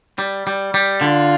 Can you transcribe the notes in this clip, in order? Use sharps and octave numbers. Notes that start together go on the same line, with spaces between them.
G3
G3
G3
D3 F4